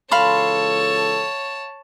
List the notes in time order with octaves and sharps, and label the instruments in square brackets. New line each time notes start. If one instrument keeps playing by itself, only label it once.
[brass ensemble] C#2 E3 A4 [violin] C#5 A5 [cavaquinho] F5 B5 C6